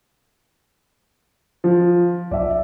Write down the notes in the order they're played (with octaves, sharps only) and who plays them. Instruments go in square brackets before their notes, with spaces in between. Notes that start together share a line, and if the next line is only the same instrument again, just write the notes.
[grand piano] F3
[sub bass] B1 [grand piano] D5 E5